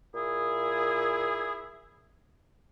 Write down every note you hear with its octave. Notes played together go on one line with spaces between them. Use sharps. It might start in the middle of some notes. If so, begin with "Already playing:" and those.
A#2 E4 G#4